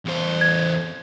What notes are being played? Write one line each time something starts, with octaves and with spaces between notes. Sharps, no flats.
E2 C5
G#6